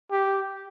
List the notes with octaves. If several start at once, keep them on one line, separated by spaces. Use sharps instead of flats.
G4